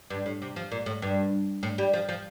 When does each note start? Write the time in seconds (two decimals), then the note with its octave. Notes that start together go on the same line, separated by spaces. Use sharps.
0.10 G2
0.26 A2
0.42 C3
0.56 F3
0.72 A#2
0.86 A2
1.02 G2
1.63 A2
1.78 G3
1.93 F3
2.09 F3